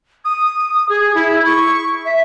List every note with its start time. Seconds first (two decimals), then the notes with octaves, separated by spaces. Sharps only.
0.25 D#6
0.89 G#4
1.15 E4
1.46 C#6
2.05 E5